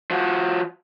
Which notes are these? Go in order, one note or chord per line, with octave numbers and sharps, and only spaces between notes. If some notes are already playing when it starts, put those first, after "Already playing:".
F3 F#4